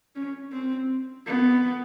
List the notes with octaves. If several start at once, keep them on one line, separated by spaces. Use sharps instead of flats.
C#4
C4
B3